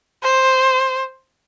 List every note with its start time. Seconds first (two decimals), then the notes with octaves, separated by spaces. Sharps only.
0.23 C5